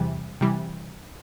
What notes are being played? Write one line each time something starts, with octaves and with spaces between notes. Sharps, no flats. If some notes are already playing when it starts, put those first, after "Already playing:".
Already playing: E2 C3 E3 G3
C3 E3 G3